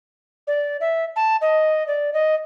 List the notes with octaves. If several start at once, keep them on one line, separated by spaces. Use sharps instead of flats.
D5
E5
A5
D#5
D5
D#5